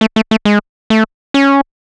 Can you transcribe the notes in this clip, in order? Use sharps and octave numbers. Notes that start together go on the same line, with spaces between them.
A3
A3
A3
G#3
A3
C#4